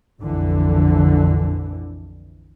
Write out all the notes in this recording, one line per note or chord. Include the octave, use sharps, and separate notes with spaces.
A#1 F2 D3 E3